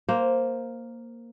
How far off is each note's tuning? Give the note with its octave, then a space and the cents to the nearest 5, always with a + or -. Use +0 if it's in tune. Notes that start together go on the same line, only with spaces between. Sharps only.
A#3 +0 C5 +5